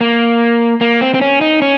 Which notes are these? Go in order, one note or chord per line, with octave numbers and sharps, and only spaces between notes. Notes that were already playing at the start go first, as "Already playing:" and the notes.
A#3
A#3
C4
C4
C#4
D#4
C#4